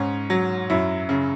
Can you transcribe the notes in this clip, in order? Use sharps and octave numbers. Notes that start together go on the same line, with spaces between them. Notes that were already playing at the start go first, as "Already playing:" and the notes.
Already playing: G#2 C#4
F#3
F#2 E4
C#3